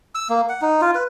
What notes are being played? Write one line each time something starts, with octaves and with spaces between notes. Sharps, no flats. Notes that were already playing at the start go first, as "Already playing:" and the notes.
E6
A#3
F#5
D#4
F4
B4